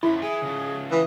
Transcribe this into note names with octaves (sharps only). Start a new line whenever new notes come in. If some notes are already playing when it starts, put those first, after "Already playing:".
F#2 F3 E4 B5
G#4 E5 G#5
C#3 F3
E3 D#6